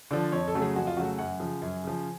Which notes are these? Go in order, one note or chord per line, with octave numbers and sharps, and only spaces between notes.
D3 F3 D5
F2 C#5
A4
C#3 F#3 A3
G#4
F2 F#4
F4
C#3 F#3 A3 F#4
F#2 F#5
C#3 F3
F#2 G#5
C#3 F3